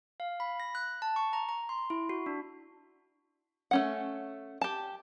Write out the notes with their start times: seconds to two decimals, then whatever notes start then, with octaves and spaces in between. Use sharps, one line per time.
0.20 F5
0.40 B5
0.60 A#6
0.75 F#6
1.02 A5
1.16 C#6
1.33 A#5
1.49 A#5
1.69 C6
1.90 E4
2.09 F#4
2.26 D4
3.71 A3 C#4 F#5
4.61 G4 A5